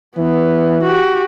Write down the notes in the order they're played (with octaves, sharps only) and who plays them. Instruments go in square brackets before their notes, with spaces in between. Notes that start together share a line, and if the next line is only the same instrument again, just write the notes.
[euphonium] E3 [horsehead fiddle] B3
[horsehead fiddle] F#4 G4